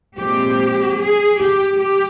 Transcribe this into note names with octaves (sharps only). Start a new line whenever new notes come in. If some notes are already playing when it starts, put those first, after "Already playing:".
A#2 F3 G#3 C4 G4
G#4
G4
G4